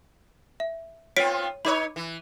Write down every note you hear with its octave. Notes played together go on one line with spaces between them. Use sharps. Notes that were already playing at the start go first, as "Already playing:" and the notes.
E5
B3 C4 F4 C#5 B6 D7
D#4 B4 C#5 B5 D6
E3